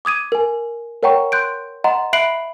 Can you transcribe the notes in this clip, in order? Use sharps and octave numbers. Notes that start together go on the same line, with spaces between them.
D6 D#6 G#6 D#7
A#4 G#5
A#4 C#5 F#5 G5 A#5 C#6
C6 F#6 G6 D7
D#5 F#5 A#5 C6
E5 B5 F#6 C7 D7 F#7